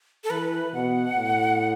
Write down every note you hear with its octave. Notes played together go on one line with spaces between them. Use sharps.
A4
E3 B4
B2 F#5
A2